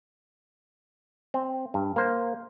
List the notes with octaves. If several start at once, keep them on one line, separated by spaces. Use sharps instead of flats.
C4
G2
A#3 C5